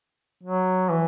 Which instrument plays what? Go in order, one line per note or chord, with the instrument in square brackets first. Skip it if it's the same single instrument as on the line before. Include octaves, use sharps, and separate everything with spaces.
[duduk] F#3
E3